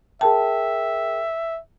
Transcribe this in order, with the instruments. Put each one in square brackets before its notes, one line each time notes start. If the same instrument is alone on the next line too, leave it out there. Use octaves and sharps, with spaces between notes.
[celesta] G#4 A#4 G5 [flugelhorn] E5 [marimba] A5